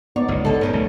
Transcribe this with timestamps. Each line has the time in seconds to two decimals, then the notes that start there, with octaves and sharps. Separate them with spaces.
0.16 B3 D#4 C#5 D5
0.28 G1 C#2
0.45 D3 A4
0.61 G2 A#2 B3 C#4
0.73 C2 A3